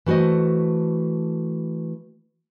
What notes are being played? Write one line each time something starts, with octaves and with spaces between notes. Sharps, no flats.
E3 A3 F#4 C5 D#5